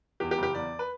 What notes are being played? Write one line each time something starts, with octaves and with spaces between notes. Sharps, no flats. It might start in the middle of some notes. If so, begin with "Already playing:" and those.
E2 G4
G4
F#1
G4
E2 D5
B4